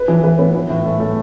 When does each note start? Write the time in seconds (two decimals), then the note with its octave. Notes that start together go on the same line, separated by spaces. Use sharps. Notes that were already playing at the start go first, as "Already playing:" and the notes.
Already playing: B4
0.08 E3
0.24 B4
0.39 B3
0.54 E3
0.70 A2
0.86 A3
1.00 A3